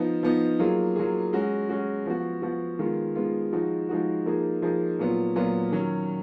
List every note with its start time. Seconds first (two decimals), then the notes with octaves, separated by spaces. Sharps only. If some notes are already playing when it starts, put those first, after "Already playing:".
Already playing: F3 B3 D#4
0.23 F3 B3 D#4
0.59 F#3 A#3 F4 G#4
0.96 F#3 A#3 F4 G#4
1.33 G#3 C#4 F#4
1.69 G#3 C#4 F#4
2.06 F3 B3 F#4
2.42 F3 B3 F#4
2.79 D#3 G#3 B3 F4
3.16 D#3 G#3 B3 F4
3.52 F3 G#3 D#4 F#4
3.89 F3 G#3 D#4 F#4
4.26 F3 A#3 D#4 G#4
4.62 F3 A#3 D#4 G#4
4.99 A#2 F#3 B3 F4
5.36 A#2 F#3 B3 F4
5.72 D#3 F#3 C#4